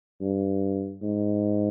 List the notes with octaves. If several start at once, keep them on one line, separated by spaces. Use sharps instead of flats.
G2
G#2